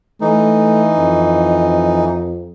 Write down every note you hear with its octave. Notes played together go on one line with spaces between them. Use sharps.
E3 A3 D#4
F2